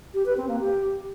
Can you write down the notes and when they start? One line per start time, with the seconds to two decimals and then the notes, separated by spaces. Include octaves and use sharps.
0.14 G4
0.26 B4
0.37 C4
0.48 A#3
0.60 G4